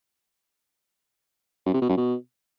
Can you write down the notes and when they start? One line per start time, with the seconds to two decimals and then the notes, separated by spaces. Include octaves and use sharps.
1.66 F#2
1.74 C3
1.81 B2
1.89 F#2
1.97 B2